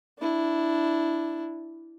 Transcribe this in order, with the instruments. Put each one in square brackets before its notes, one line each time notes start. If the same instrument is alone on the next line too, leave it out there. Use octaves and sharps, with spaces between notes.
[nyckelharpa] D4 E4